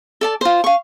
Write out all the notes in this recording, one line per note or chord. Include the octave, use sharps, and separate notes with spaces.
A4 D5 A5
F4 C5
F5 C#6